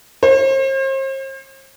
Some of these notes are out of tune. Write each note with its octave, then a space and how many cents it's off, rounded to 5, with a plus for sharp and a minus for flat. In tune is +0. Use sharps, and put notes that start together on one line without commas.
C5 +40